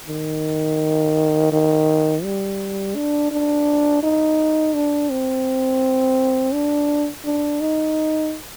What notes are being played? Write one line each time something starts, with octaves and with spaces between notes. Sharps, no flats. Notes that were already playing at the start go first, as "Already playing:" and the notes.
D#3
D#3
G3
D4
D4
D#4
D4
C4
D4
D4
D#4